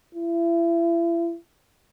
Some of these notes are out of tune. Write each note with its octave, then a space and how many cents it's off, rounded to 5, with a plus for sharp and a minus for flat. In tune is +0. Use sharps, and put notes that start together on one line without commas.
E4 +35